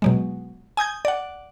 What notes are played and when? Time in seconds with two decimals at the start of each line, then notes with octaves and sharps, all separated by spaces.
0.02 B2 F#3 G#3
0.77 G#5 D#6 G6 G#6
1.05 D5 F#5